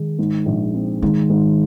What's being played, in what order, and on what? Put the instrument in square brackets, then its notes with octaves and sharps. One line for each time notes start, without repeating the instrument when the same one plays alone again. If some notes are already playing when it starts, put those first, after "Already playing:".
Already playing: [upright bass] D#3 [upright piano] G#3
[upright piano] G#2
A#1
C4
[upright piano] G#2 [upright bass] D#3
[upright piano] G#2